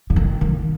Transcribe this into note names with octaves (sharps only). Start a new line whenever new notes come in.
D3
D#3
D#3